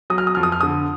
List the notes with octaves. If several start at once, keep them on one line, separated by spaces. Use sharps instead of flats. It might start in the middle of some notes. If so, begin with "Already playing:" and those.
F#3 D#6
F6
D#6
F2 F6
D#6
F6
D3 D#6